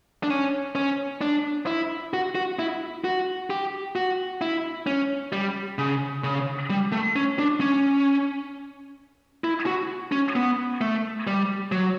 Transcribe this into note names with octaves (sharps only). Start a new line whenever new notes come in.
D4
C#4
C#4
D4
E4
F#4
F#4
E4
F#4
G4
F#4
E4
C#4
G3
C#3
C#3
G3
A3
C#4
D4
C#4
E4
F#4
C#4
B3
A3
G3
F#3